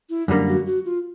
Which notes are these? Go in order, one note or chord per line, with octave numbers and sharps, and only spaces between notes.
E4
F#2 D3 G3 A#3
F#4
F#4
F4